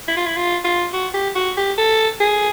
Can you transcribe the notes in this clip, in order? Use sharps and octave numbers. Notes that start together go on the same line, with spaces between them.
E4
F4
E4
F4
F4
F#4
G4
F#4
G4
A4
G#4